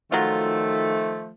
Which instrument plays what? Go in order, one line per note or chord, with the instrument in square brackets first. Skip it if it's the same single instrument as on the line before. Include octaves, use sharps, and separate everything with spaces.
[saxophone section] D#3 F3 A3 [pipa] F#3 F4